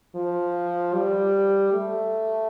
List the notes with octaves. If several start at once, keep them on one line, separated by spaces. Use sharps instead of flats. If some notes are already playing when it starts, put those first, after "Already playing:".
F3
G3
A3